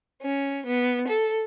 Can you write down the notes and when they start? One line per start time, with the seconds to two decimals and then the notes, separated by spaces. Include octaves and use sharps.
0.21 C#4
0.65 B3
1.06 A4